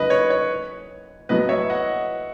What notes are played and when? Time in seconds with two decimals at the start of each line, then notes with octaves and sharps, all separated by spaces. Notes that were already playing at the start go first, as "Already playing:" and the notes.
Already playing: F#2 C#3 G#3 D#4 B4 D#5
0.10 C#5
0.30 C#5
1.29 A2 F#3 B3 B4 D#5
1.49 C#5 E5
1.70 D#5 F#5